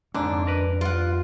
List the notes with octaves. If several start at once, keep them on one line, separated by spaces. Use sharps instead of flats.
F2 G#2 D3 C#4 D4
A#4 B4
G3 F4 F#5